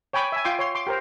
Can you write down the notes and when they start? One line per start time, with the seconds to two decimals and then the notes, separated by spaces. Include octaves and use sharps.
0.13 C#5 G5 G#5 B5 D6
0.32 E5 G#5
0.45 F4 G5 C6 D6
0.59 C#5 C6
0.75 C6 D6
0.87 G4 A#4 C5